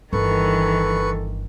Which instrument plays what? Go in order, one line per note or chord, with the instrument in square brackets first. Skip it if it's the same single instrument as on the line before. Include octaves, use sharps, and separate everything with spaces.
[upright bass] G1 [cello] D#3 E3 [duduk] A4 [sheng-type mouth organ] B4 C#6